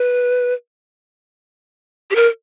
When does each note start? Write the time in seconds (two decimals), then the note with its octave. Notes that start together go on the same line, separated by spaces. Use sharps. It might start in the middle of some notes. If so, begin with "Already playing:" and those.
Already playing: B4
2.11 G4
2.15 A#4